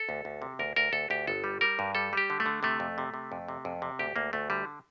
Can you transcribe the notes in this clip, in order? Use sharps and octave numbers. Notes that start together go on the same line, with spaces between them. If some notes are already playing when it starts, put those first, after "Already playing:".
Already playing: A4
D2
D2
C3
D2 A#4
D2 A#4
D2 A4
D2 G4
G1 A4
G3
G3 A#4
G2
G3 A4
G3 G4
D3
A3
D3
C3 A3
F2
C3
C3
F2
C3
F2
C3
D2 G4
D2 A#3
D2 A3
D3 G3